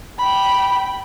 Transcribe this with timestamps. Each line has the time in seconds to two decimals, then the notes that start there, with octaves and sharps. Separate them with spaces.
0.18 G5 B5